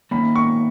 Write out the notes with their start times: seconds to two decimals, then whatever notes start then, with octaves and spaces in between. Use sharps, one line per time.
0.11 D#3 A#3 C#4 B5
0.36 C#6